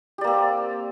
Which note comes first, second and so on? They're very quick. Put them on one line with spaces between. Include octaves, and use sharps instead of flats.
G4 D5 A#3 C4